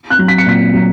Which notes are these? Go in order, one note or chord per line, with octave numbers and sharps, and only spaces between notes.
F#6
F#3
B6
C#7
A#2 B6
F#3